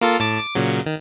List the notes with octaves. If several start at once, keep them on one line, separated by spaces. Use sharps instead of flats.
A#3 F4 A4
A2 A5 D6
D6
A#2 C#3 F#3
D#3